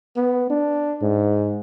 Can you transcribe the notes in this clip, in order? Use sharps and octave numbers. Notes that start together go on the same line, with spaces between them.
B3
D4
G#2